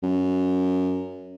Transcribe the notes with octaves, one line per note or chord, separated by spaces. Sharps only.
F#2